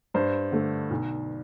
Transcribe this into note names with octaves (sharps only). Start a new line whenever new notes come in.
G2 C5
D3 A3
B1